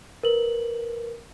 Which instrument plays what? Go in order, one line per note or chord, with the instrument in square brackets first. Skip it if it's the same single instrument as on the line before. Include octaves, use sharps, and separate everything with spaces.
[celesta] A#4 B4 F#7